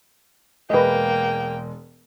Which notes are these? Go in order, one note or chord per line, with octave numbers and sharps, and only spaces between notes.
E1 G#3 A#3 B4 D#5 G5